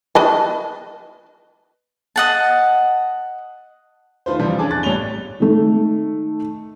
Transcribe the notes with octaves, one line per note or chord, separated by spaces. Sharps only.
B4 D#5 A5
D#5 F#5 A5
D#3 A3 F4 B4 C5
C3 E3 F3 G3
C#4 D4 G#4 G#5 A5 D6
F#6 A6
A1 G3 C#5 F7 G7
D#3 A3